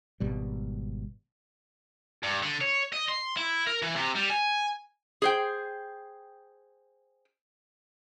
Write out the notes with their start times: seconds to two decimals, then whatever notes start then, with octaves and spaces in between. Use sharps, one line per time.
0.20 G#1 B2 G3
2.23 G2
2.43 D3
2.61 C#5
2.93 D#5
3.09 C6
3.37 E4
3.67 A#4
3.82 E3
3.95 C3
4.15 G3
4.30 G#5
5.22 G#4 C5 G5